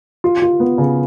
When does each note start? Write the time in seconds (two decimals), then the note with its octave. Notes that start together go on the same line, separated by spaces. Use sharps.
0.24 F4
0.42 F4
0.60 B3
0.78 C#3